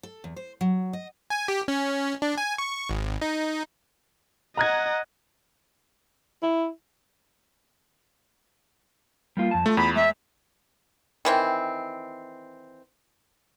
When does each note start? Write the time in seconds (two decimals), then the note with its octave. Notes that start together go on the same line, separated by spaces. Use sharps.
0.03 A4
0.24 E2
0.36 C5
0.61 F#3
0.93 D#5
1.30 G#5
1.48 G4
1.68 C#4
2.22 D4
2.38 G#5
2.58 C#6
2.89 G#1
3.21 D#4
4.57 D#5 F#5 A#5 F#6 G#6
6.42 E4
9.37 G3 A#3 F4
9.51 F2 A5
9.66 A3 F4
9.77 E2 B5
9.96 G#3 E5
11.25 D#3 E3 C4